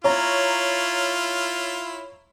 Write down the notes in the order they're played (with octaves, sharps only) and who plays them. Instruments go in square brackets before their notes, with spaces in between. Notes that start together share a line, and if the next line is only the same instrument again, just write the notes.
[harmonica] E4 F4 [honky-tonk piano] C#5 A#5